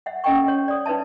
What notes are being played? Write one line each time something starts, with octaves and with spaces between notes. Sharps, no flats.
E5 F#5
C#4 A4 D#5 F#5 G5 C#6
C#5
D5 D#6
D#4 B4 C#5 E5 A5